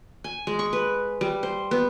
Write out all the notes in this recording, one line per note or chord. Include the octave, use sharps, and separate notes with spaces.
G#5
G#3
C#6
B4
G3
C5
B3